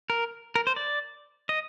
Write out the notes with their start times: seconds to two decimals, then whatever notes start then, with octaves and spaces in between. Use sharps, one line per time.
0.10 A#4
0.55 A#4
0.67 C5
0.76 D5
1.49 D#5